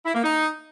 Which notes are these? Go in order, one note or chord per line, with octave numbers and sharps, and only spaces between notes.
E4
A#3
D#4